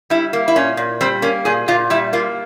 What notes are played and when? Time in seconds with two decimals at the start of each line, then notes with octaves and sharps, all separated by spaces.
0.10 G3 E4
0.33 A#3
0.48 E4
0.56 A#2 C#4
0.77 A#2
1.01 G3 C4
1.22 A#3 C#4
1.45 A#2 G#4
1.68 A#2 F4
1.90 G3 E4
2.13 A#3 F4